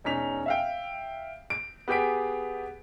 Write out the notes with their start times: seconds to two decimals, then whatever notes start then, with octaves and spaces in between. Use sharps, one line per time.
0.04 E1 C#4 D#4 B6 F7
0.46 E5 F5 G5
1.50 D7
1.88 B3 G4 G#4 B6 D7